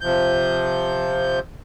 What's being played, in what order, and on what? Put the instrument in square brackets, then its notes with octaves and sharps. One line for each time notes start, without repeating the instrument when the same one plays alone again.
[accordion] C3 F3 G6